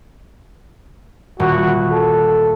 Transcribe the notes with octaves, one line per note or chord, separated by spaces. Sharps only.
D#1 F#4
A4